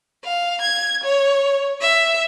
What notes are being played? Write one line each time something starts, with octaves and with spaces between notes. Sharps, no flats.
F5
G#6
C#5
E5